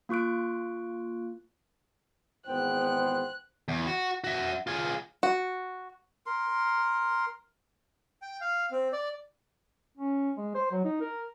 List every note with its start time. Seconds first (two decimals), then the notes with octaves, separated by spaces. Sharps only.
0.09 A#3 F4 C#6 F#6 D7
2.47 G#1 E2 B3 C5 G5 F#6
3.68 E2
3.87 F#4
4.24 F#4 E5
4.67 F4 G#4
5.23 F#4
6.26 A#4 C6
8.22 G5
8.41 F5
8.71 C4
8.93 D5
9.97 C#4
10.37 G#3
10.55 C5
10.71 F#3
10.85 D#4
11.01 A#4